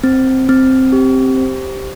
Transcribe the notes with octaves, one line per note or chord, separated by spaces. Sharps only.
C4
C4
G4
C5